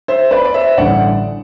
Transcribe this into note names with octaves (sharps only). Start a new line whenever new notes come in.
C5 E5
B4 D5
D5
C5 E5
A1 G2 D3 D5 F#5